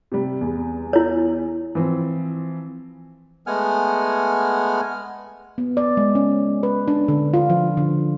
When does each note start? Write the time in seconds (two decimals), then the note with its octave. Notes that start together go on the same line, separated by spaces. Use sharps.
0.12 C3 G3
0.41 E2
0.93 E4 C#5
1.75 E3 F3 C4
3.47 G#3 A3 B3 F#5 G#5 F6
5.58 B3
5.77 D5
5.97 G#3
6.15 C#4
6.63 B4
6.88 D4
7.08 D3
7.34 F4
7.50 F3
7.77 D3